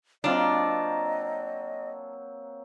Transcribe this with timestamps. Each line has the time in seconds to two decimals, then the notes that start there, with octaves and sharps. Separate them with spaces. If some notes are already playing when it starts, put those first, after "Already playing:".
0.24 F#3 A#3 C4 D4 F4 D#5